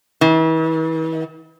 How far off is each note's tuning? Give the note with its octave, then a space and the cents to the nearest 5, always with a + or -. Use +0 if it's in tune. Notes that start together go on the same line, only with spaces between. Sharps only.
E3 -40